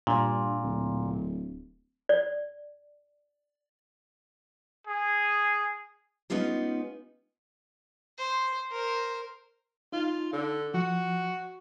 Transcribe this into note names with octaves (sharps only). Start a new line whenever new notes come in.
G2 A#2
D1
D5
G#4
G#3 B3 C#4 D#4 F4 G4
C5
A#4 C5
D#4 F4
D3
F3 F#4